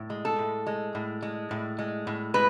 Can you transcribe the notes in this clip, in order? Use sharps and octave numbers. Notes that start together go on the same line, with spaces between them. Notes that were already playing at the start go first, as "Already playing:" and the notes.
Already playing: A2
G#3
A4
A2
G#3
A2
G#3
A2
G#3
A2
G#3 B4